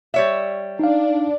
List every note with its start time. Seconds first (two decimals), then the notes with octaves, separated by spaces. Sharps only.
0.14 G3 C#5 E5
0.79 D4 D#4 F5